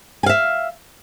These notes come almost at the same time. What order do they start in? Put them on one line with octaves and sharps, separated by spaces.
G#5 F5 E5